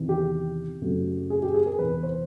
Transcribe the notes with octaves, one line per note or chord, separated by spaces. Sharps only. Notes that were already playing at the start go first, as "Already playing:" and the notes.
Already playing: E2 C3 D#3
G4
F#2 C#3 F#3 A3 C4
G#4
G4
G#4
A#4
E2 C3 E3 B4
C5